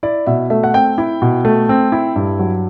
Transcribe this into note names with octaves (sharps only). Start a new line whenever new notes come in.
E4 D5
B2 E5
A3 E5
F#5
C4 G5
E4
B2
A3
C4
E4
G2
F#3